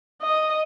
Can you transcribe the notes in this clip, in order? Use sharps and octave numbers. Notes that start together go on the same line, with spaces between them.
D#5